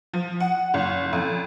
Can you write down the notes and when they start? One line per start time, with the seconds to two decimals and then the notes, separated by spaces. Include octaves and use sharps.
0.14 F3
0.40 F#5
0.74 F#1
1.13 F2